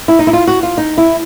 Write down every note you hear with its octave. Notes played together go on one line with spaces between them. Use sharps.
E4
D#4
E4
F4
F#4
F4
D#4
E4